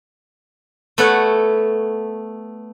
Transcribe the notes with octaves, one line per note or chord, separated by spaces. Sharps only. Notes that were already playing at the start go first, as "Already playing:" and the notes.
A3 B3 A4 C#5 F#5